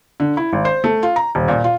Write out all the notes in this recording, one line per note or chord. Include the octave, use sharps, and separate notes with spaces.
D3
E4
G#1
C5
A3
F4
A#5
D#1
A#2
F4